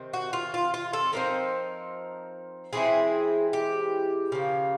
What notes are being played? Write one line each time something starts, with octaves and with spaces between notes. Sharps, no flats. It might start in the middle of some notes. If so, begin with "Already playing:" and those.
Already playing: C3 D#3 C4
F#4
F4
F4
F4
A4
F3 G#3 C4 D#4 A#4
E3 G#3 C4 E4 G#4
G4
C#3 F3 A#3